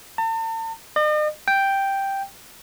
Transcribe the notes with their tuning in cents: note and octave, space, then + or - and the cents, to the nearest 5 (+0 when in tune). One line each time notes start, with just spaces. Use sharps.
A5 +40
D#5 -45
G5 +0